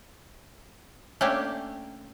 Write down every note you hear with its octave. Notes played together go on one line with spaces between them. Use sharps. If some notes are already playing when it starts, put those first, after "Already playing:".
A3 A#3 C#4 D4 G4